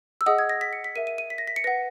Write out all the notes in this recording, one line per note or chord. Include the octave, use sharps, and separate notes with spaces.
E6
G#4 D#5 F#5 D#6
G#6
A#6
B6
C#7
B6
A#4 E5 D#7
D#7
D#7
B6
A#6
B6
C#7
B4 F#5 A#6